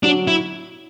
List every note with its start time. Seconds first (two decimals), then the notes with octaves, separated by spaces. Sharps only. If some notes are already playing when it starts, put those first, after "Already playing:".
0.03 F#3 D4
0.27 E4